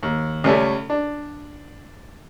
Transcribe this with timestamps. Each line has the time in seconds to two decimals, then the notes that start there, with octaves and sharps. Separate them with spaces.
0.03 D#2
0.44 C#2 G3 A3 C#4 E5
0.90 D4